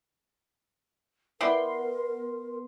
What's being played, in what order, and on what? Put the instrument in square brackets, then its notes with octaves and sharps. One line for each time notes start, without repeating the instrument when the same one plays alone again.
[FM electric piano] B3 C6 [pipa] E4 D5 G5 [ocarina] A#4